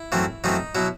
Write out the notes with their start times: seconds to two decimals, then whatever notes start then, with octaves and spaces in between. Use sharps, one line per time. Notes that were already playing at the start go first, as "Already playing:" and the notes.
Already playing: E4
0.12 F#2 E3 A3 C4
0.44 F#2 E3 A3 C4 D#4
0.75 B2 F#3 E4